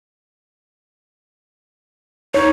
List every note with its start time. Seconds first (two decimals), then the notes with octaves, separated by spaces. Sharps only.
2.34 D#4 C#5